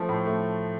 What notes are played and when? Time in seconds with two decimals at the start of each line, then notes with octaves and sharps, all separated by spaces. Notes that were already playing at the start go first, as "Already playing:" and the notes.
Already playing: F3 A3
0.09 A2
0.26 A3